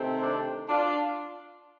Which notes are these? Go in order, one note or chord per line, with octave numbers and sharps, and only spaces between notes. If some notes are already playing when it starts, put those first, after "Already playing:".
Already playing: C3 D#3 A3 C4
D4
D4 F4